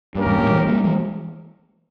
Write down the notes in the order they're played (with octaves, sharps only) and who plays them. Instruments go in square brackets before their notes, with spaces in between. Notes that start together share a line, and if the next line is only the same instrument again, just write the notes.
[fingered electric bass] G2 [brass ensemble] A#3 C#4 G4 A#4
[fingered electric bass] E2 G#2
G2 A#2
E3 G#3
G3 A#3
E3 G#3